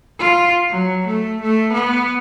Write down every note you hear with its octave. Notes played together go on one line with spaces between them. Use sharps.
F4
F#3
A3
A3
B3